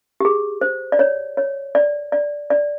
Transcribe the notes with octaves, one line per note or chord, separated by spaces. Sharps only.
G4
G#4
C5
D5
C#5
C#5
D5
D5
D5